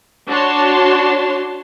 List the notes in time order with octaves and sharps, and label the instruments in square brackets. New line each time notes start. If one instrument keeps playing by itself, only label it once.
[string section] D4 F#4 C#5 A5 C6